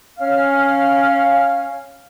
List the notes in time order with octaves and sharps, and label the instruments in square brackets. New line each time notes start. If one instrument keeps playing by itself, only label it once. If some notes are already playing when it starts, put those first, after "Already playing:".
[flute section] C#4 F5 F6